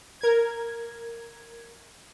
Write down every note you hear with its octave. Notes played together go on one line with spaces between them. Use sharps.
A#4 G#6